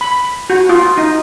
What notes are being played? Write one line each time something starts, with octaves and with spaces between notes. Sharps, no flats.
B5
F#4
F4
D#4